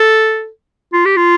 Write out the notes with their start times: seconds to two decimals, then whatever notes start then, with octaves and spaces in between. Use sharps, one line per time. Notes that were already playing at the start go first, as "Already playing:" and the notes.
Already playing: A4
0.93 F4
1.05 G4
1.17 F4